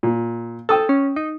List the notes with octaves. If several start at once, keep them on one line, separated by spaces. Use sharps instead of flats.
A#2
A4 G5 D#6 E6
C#4
D#4